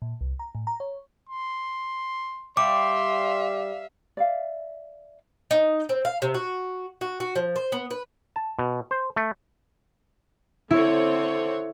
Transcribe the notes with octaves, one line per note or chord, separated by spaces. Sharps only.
A#2
C2
A#5
A2
A#5
C#5
C6
G3 E5 F5 C6 D6
D5 E5 F5
D#4
C4
F5
C3
F#4
F#4
F#4
F3
C5
B3
B4
A5
B2
C5
A3
D3 C4 E4 C#5